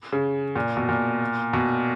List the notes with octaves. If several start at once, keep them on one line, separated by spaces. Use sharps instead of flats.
C#3
A#2
B2
A#2
B2